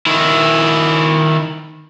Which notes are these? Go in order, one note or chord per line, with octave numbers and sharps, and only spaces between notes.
D#3 E4